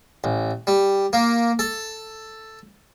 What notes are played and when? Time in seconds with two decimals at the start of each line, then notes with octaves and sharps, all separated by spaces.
0.24 A1
0.67 G3
1.13 A#3
1.59 A4